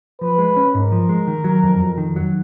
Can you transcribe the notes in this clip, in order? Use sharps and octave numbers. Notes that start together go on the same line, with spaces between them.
F3 B4
G#3
C#4
G#2 A#4
F3
G#3
D#3
F#3
F2
F2
D#3
F#3